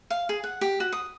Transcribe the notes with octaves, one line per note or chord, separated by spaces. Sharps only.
F5
G#4
F#5
G4
F#4
D#6